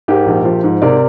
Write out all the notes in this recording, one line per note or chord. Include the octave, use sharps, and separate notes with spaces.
G#2 G4 A#4
A#1
F3
G#2
C3 A#4 D5